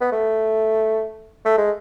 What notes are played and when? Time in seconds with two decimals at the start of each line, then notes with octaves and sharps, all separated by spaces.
0.01 B3
0.12 A3
1.45 A3
1.58 G#3